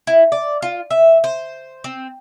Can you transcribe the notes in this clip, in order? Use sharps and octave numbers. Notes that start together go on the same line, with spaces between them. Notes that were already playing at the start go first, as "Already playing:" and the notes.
E4
D5
F4
E5
C5
C4